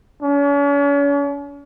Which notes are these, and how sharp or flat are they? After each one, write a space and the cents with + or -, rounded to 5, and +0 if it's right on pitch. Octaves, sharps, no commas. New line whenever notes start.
C#4 +40